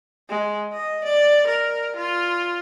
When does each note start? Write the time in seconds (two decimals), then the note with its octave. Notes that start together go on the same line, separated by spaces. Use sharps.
0.29 G#3
0.73 D#5
1.04 D5
1.47 A#4
1.96 F4